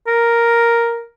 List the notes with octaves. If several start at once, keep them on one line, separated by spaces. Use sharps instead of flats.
A#4